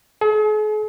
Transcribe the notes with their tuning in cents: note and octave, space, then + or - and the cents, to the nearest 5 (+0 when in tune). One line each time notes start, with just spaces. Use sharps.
G#4 +45